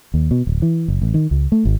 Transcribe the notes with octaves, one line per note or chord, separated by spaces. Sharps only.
D#2
B2
D1
E3
F#1
A1
D#3
C#2
A3
G#1